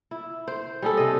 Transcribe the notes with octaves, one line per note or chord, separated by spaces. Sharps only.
E4
C5
G3 G#4 A4
C3 D#5